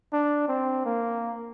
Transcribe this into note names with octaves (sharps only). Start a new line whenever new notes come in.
D4
C4
A#3